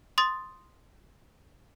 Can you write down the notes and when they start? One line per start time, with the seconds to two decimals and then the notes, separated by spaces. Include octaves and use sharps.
0.18 C6 D#6 A6